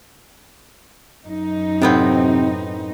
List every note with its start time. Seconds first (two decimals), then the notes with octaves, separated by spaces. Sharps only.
1.25 F#2 D#4
1.82 A2 C3 B3 C4